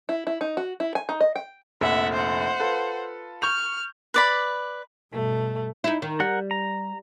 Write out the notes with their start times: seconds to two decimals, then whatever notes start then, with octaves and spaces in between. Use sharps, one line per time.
0.09 E4
0.27 E4
0.41 D#4
0.57 F#4
0.80 E4
0.95 G#5
1.09 D#4
1.21 D#5
1.36 G5
1.81 F1 A#1 E5 F#5
2.13 C5 F#5
2.59 F4 A4 B4
3.42 C#6 F6 G6 F7
4.14 B4 D5 B5
5.12 G2 B2 A3
5.84 D#4 E4
6.02 D#3
6.20 G3 A#4 F#5
6.51 A#5